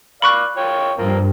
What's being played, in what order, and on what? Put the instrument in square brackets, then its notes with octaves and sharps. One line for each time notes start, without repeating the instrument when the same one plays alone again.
[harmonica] D5 F5 [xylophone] B5 C#6 F#6
[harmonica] F4 C#5 G5
[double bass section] G2 [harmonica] F3 A#3 C4